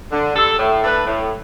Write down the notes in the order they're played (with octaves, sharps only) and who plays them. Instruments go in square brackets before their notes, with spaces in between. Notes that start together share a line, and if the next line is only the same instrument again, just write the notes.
[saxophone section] D3
G3 D4 A4
A2
A3 D4 B4
A2